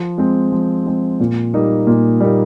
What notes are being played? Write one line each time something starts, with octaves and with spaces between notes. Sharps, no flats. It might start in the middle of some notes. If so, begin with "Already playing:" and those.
Already playing: F3
G#3 C4
F3
G#3 C4
A#2
G3 A#3 D#4
A#2
G3 A#3 D#4